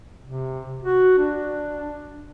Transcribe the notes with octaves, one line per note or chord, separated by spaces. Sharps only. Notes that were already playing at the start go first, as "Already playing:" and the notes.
C3
F#4
D4